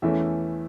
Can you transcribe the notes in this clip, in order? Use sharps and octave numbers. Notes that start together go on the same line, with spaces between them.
E2 E3 A3 C#4 E5